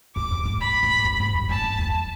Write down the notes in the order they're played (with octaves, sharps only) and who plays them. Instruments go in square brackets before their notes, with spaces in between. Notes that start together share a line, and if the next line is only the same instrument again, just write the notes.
[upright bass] F#2 [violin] D6
[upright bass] F2
G#2
[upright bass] F#2 [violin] B5
[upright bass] G#2
F#2
G#2
F#2
[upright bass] F#2 [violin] A5
[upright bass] F#2
F2